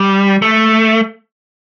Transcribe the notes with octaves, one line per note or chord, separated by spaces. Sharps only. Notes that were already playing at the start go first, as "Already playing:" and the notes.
Already playing: G3
A3